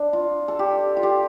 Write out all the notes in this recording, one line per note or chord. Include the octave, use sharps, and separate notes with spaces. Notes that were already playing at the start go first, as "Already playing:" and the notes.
Already playing: D4
F4
A4
G4
F4
G4